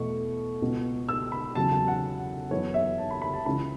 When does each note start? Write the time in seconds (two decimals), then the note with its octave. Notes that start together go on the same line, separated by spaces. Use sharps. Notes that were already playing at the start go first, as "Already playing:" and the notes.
Already playing: E2 B2 A3 E4 C#6
0.62 C#2 B2 B3
1.09 E6
1.32 B5
1.55 E2 C#3 F#3 A5
1.72 A5
1.88 F#5
2.51 F#2 E3 B3 C#5
2.74 E5
2.98 A5
3.11 B5
3.22 B5
3.34 A5
3.46 C#2 C#3 E3 C#4 B5